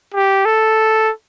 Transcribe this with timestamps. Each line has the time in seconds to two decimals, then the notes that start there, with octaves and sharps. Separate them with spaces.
0.14 G4
0.45 A4